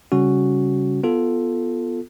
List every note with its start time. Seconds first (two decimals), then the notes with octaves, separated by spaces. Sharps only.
0.12 C#3 G3 C#4 F#4
1.03 B3 F4 A4